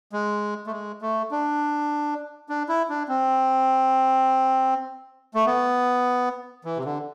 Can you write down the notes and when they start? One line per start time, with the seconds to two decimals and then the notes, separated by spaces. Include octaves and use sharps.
0.13 G#3
0.67 A3
0.71 G#3
1.02 A3
1.31 D4
2.49 D4
2.69 E4
2.89 D4
3.08 C4
5.34 A3
5.46 B3
6.65 E3
6.77 C3
6.85 D3